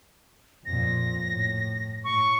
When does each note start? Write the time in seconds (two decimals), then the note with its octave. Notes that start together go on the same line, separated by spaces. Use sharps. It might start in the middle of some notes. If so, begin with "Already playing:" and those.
0.66 F2 A#2 A#6
1.27 A2
2.04 A2 C#6